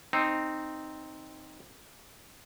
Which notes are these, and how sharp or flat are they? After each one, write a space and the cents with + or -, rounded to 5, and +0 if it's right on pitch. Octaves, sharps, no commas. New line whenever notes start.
C4 +0 D#4 -5